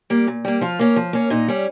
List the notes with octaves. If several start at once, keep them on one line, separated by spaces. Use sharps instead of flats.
G3 A#3
A#2
G3 A#3
F3 F4
A#3 C#4
F3
A#3 C#4
A#2 D#4
G3 C#4